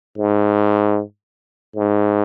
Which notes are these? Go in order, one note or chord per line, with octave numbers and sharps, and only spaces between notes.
G#2
G#2